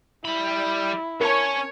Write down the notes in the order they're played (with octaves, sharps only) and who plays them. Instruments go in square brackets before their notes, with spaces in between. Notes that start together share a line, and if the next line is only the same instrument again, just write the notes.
[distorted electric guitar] G3 B5 [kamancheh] E4
[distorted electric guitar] C#4 [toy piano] A#4 A5 [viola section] C#5